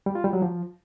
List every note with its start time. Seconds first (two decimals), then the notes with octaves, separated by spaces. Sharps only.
0.06 G3
0.15 F4
0.24 G3
0.33 F#3
0.42 F3